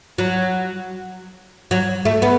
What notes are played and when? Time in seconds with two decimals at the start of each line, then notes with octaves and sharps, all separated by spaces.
0.18 F#3
1.71 F#3
2.05 A3
2.22 B3